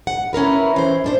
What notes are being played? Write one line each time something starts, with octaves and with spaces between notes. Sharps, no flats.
F#5
C#4 E4 A#4 B4
E3 C5
G#2 D4 C5